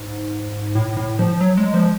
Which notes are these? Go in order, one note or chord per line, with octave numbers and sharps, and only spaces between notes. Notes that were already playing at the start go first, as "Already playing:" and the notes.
Already playing: G#2
A2
A2
F3
F#3
G#3
F3